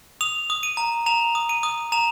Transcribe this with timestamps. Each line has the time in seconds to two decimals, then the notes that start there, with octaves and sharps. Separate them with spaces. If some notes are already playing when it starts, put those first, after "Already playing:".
0.21 D#6 F7
0.50 D#6
0.63 D#7
0.77 A#5
1.06 A#5 F7
1.35 D#6
1.49 D#7
1.63 D#6
1.92 A#5 F7